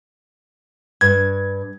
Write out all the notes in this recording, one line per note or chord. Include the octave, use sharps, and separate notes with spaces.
G2 G#6